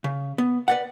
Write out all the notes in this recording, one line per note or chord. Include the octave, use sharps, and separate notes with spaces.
C#3
B3
B4 D5 F#5